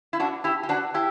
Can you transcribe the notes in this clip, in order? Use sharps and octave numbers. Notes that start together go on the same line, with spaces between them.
E4
D4 F#4
E4 G4
G4
D4 F#4
E4 G4